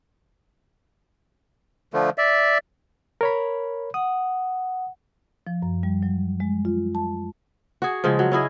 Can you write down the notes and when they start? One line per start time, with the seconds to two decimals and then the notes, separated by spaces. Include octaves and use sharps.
1.94 D3 F3 A3
2.18 D5 E5
3.21 A#4 C#5 B5
3.94 F#5 D#6
5.47 F3
5.62 F#2
5.83 G3
6.03 F#3
6.40 G#3
6.65 F4
6.95 A5
7.82 F#4 G#4
8.04 C#3 F3 G#3
8.19 F#3
8.32 C#4 E4 G#4 D#5